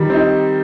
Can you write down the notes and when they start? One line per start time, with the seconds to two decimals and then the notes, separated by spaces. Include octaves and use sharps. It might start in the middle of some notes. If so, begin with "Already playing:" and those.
Already playing: D#3 G3
0.10 C4 D#4